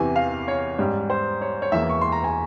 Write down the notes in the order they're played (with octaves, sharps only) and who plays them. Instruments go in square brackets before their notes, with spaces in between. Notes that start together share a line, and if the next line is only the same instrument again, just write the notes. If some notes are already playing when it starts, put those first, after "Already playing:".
Already playing: [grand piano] E2 C3 E3 G#5
F5
C#5
G#2 G3 C#4
C5
C#5
C#5
E1 E2 E3 A#3 E5
C#6
C6
A#5
G#5